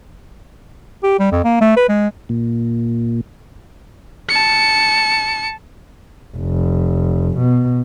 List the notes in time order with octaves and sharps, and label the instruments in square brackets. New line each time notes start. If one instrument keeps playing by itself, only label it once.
[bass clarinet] G4
G3
F2
A#3
A3
B4
G#3
[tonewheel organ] A#2
[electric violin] A5 C#7
[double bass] F1
B2